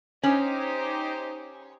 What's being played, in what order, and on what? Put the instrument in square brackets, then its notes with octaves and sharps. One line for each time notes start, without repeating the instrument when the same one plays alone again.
[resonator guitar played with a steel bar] C#4 [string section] D#4 G4 C5